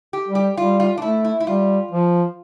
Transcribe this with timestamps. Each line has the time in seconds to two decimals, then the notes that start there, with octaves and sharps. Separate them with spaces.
0.13 G4
0.28 G3
0.35 G4
0.57 G3 F4
0.80 F4
0.98 D4
1.02 A3 E4
1.25 E4
1.40 E4
1.47 G3 F4
1.91 F3